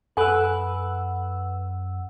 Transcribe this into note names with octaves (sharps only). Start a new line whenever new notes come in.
F#2 A4 B4 F#5 G#5 E6